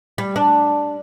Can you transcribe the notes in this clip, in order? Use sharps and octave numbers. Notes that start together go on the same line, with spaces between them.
G3
D4